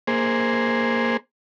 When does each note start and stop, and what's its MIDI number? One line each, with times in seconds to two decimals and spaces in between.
0.07 1.17 58
0.07 1.17 68
0.07 1.17 72